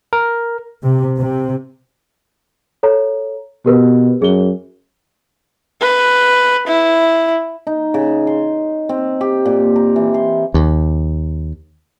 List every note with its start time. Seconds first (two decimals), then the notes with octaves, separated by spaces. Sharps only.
0.13 A#4
0.83 C3
1.18 C3
2.83 A4 C#5 A#5
3.66 B2 G4 A#4 B4
4.22 F#2 G#4 G7
5.81 B4
6.67 E4
7.67 D#4
7.94 C#3
8.27 C6
8.89 C4
9.21 G4
9.45 A#2
9.76 A#5
9.96 E3
10.14 C6
10.54 D#2